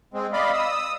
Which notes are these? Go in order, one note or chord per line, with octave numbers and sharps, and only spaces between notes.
G#3 C4
D5 D#5 F5 B5
D#6 E6